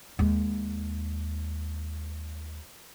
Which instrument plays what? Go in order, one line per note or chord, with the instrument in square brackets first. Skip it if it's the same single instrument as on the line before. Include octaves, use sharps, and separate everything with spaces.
[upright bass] D#2 G#3